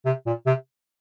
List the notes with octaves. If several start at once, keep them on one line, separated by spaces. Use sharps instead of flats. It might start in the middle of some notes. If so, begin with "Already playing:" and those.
C3
A#2
C3